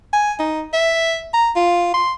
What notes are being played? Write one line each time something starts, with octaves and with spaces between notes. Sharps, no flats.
G#5
D#4
E5
A#5
F4
C6